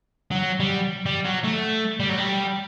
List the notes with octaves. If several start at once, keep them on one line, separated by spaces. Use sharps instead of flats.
F#3
G3
G3
F#3
A3
G3
F#3
G3